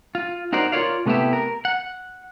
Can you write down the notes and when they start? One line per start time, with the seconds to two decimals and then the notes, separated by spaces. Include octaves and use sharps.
0.15 F4
0.53 D#4 F#4 A#4 C5 D5
0.72 F4 A#4 B4 C#5 D5 F5
1.06 C3 A3 B3 E4 G4 E5
1.33 A#4
1.65 F#5